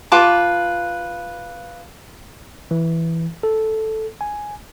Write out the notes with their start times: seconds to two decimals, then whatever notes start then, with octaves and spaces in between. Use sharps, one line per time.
0.12 F4 B4 A5 D6
2.71 E3
3.43 A4
4.21 G#5